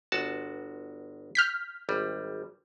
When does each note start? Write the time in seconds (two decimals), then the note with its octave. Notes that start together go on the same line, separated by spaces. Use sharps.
0.12 G1 F#4 A5
1.35 F6 G6 B6
1.89 G#1 G3